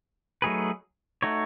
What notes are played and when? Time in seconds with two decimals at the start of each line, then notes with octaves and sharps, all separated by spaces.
0.42 F#3 A3 D#4 G#4 B4
1.22 A3 D#4 F#4 C#5